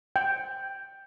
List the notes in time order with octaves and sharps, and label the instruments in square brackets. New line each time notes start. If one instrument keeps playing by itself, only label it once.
[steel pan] G5